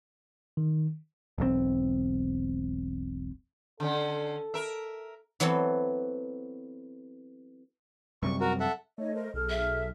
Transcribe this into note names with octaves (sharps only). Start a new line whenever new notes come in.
D#3
E1 B1 B2 C4
D3 C#4 A4
A#4 E5
E3 F#3 B3 C4 A4
F#2 C3 G3 C#6
F#4 A#4
A4 E5 F#5
A3 D#4 C#5 D#5
A#4 C5 D#5
B1 G#4 A4 F6
E5